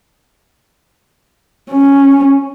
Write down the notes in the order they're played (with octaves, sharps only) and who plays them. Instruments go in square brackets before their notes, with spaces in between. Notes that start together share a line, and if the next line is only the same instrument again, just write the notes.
[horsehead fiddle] C#4